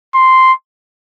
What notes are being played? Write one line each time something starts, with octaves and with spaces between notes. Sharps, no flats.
C6